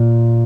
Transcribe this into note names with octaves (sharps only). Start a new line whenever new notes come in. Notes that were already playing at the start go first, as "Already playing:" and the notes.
Already playing: A#2